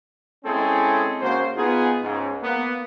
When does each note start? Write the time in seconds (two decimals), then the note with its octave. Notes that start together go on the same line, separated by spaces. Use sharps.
0.44 G#3 C4 C#4 E4 G#4 A4
1.21 C#3 A#3 F#4 C5
1.56 B3 D#4 F4 G#4
2.02 C#2 G#2
2.43 A#3 B3